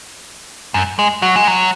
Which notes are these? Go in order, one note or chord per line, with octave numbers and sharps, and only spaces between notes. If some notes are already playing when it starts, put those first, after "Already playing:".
F#2
G#3
F#3
G#3
F#3